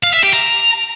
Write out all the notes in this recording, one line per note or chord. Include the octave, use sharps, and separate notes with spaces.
F5
E5
G4
A#5